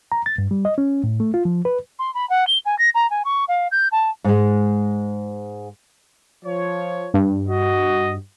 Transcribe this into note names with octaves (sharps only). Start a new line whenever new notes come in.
A#5
A6
G2
G3
D#5
C#4
A2
A3
F4
F3
B4
C6
B5
F#5
G7
G#5
A#6
A#5
G#5
C#6
F5
G6
A5
G#2 G#3
F3 C#5
G2
F#4 D#5